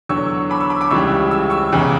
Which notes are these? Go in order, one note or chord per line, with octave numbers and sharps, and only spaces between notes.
E2 D3 F#3 C#6 E6
B5 D6
C#6 E6
B5 D6
B5 D6
C#2 C#3 E3 G3 C#6 E6
E6
C#6 E6
E2 C#3 E3